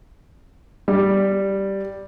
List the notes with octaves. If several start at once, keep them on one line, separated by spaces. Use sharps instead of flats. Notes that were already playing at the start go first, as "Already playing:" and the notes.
G3